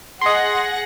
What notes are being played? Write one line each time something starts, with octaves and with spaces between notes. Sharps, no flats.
G#4 D#5 F#5 C6 A#6